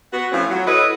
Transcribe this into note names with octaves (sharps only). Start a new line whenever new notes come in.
B3 F#4
E3 F3 A3 C4 C#4
F#3
E4 A4 B4 C#5 D#5